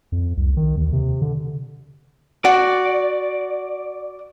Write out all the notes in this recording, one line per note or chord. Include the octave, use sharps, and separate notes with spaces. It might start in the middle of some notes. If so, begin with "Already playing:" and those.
F2
C2
D#3
D#2
C3
D3
F#4 D5